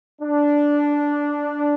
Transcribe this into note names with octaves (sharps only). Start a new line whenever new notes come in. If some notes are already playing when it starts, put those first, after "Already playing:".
D4